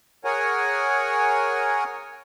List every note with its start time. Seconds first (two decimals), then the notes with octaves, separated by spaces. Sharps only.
0.25 G#4 A#4 C#5 F#5 G#5